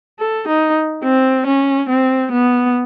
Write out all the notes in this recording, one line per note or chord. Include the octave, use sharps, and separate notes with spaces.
A4
D#4
C4
C#4
C4
B3